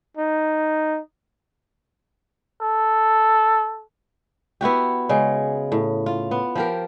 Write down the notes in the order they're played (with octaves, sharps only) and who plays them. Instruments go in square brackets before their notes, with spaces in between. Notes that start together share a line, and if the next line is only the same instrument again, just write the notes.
[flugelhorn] D#4
[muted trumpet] A4
[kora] B3 E4 F#4 G4
C#3 G#3
A2
F4
B3
F3 G4 A#4